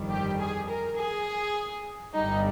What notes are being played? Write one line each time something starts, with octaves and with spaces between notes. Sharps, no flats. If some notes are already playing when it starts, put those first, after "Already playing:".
Already playing: G1 F2 D#3 G3
G4
G#4
A#4
G#4
G1 G2 G3 D#4